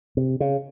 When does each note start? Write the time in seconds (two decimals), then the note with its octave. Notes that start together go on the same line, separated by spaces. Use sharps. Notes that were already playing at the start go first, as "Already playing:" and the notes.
0.17 C3
0.40 C#3